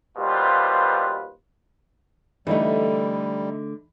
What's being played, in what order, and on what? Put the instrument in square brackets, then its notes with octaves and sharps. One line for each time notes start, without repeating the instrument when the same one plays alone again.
[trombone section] D#2 B2 G3 F4 B4 C5
[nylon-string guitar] D3 A3 [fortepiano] E3 D#4 [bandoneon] G3